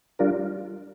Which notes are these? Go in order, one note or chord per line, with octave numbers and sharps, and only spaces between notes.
G3 D4 F4 A#4